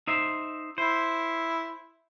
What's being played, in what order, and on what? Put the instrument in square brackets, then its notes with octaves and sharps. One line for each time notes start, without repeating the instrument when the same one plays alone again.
[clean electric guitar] D#4 C5 E5
[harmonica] E4 [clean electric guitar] C5